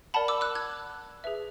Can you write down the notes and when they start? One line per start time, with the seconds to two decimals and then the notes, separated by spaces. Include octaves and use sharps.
0.14 A#4 D5 F#5 A5 B5
0.28 D6 E6
0.41 E6 F#6
0.55 F#6 G#6
1.24 G#4 B4 E5